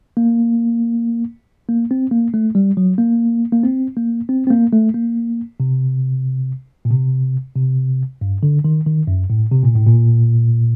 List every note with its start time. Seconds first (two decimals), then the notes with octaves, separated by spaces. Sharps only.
0.17 A#3
1.69 A#3
1.91 C4
2.11 A#3
2.34 A3
2.55 G3
2.77 F#3
2.98 A#3
3.52 A#3
3.64 C4
3.97 A#3
4.29 C4
4.47 C4
4.51 A#3
4.73 A3
4.94 A#3
5.60 C3
6.85 A#2
6.90 C3
7.56 C3
8.21 G2
8.43 D3
8.64 D#3
8.87 D#3
9.07 F#2
9.30 A2
9.52 C3
9.63 A#2
9.75 A2
9.87 A#2